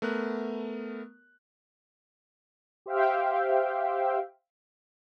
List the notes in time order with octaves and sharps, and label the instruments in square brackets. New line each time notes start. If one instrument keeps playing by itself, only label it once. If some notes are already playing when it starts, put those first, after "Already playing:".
[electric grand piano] A3 B3 A#4 F#6
[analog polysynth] G4 C5 E5 F5 G5